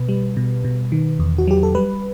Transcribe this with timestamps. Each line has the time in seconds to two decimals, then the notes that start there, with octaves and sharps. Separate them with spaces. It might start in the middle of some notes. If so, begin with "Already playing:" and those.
Already playing: B2 B4
0.09 G3
0.37 B2
0.65 B2
0.92 D#3
1.20 E2
1.38 F#4
1.47 F#3 G4
1.63 A4
1.75 G3 B4